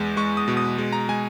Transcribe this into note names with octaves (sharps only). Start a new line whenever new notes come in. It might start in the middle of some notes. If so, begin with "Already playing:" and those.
Already playing: E2 G#3
G#3 C#6
D#6
B2
D#6
G#3
A#5
G#3 G#5